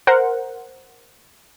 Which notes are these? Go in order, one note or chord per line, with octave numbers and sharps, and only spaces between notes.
A#4 C5 F#5